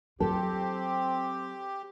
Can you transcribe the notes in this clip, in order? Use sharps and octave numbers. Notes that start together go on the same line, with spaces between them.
F#3 C4 F4 G4 A4